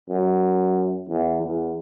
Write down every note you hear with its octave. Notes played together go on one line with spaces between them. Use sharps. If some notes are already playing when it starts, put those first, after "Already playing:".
F#2
E2
E2